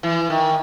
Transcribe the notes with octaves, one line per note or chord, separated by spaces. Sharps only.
E3
D#3